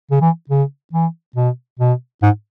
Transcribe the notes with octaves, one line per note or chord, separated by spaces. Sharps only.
C#3
E3
C#3
E3
B2
B2
G#2